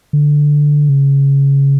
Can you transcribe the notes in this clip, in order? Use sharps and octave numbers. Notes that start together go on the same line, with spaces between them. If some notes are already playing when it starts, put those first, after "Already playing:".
D3
C#3